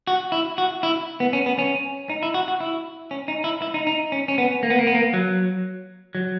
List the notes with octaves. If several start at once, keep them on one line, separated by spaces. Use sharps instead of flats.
F#4
E4
F#4
E4
B3
C#4
B3
C#4
D#4
E4
F#4
F#4
E4
C#4
D#4
E4
E4
D#4
D#4
C#4
C#4
B3
A#3
B3
A#3
B3
A#3
F#3
F#3